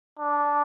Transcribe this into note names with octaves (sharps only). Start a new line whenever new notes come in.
D4